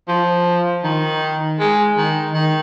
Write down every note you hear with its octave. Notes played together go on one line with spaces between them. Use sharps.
F3
D#3
G#3
D#3
D#3